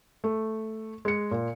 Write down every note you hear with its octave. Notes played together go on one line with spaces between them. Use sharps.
A3
G#3 C#7
A#2